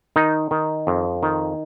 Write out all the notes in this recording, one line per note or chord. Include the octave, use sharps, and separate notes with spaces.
D#3 D#4
D#3
F2
D#3